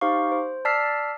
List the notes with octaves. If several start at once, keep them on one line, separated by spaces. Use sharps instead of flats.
D#4 G4 C5 F5 C#6
C5
D5 A5 E6 F6 B6 C7